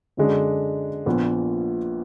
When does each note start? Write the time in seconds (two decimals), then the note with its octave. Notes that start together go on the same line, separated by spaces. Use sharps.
0.17 F#2 D3 G#3 D4
1.06 A#1 A#2 F3 B3